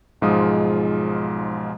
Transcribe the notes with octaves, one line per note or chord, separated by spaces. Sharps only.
B1 G#2 F3 G#3 F4 D#6